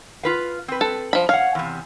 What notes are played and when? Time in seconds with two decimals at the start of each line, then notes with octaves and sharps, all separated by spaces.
0.23 F4 B4 F5
0.68 C4 B4
0.81 A4
1.13 F3 B5
1.29 C#5 F5 F#5
1.55 E2 C3